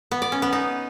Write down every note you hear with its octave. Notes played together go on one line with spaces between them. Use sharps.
B3
D5
C#4
B3
D#4